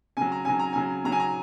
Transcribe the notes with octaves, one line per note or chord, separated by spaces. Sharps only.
C#3 F#3 G#5
A#5
C#3 F#3 G#5
A#5
C#3 F#3 G#5
C#3 F#3 A#5
G#5
A#5